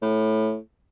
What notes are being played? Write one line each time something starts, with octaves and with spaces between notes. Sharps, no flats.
A2